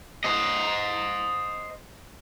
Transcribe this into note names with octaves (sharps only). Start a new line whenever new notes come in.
C5 D#5